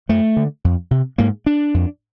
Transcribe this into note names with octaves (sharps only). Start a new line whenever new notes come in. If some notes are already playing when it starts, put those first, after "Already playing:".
F#2 A3
D3
F2
C3
G#2 A#3
D4
F2